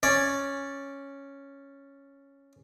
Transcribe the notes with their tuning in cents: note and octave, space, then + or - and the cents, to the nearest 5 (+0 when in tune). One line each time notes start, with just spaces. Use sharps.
C#4 +0 D5 +0